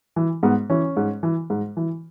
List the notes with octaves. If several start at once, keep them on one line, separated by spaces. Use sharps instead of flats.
E3
G#2 B3
E3 C#4
G#2
E3
G#2
E3